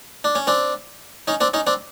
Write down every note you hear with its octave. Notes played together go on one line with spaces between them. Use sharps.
D4
C#4
C4 D4
C#4 D#4
C4 D4
C#4 D#4
C4 D4